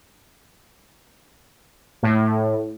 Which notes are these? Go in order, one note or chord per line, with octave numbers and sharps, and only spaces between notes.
A2